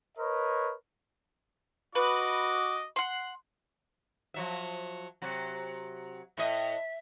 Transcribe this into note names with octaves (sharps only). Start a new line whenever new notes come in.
A#4 B4 C#5 D#5
F#4 B4 D#5 D6
F#5 C6
F3 F#3 E5
C3 F#3
A2 D#5 E5